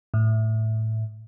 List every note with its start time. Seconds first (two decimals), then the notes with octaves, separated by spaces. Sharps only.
0.14 A2